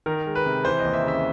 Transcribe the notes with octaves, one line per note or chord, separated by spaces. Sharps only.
D#3 A#4
G#3
B4
C3
E3 C5
D#2 D#5
E5
C#3 E5